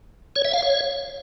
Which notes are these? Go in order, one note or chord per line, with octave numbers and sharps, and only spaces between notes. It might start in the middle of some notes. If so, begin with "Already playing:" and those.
C#5
E5
F5
C#5